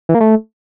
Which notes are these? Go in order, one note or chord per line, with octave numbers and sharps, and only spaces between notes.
E3
A#3
A3